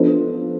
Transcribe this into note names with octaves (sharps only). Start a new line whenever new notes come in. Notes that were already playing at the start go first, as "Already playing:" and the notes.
Already playing: F3 B3 D4 A4 C5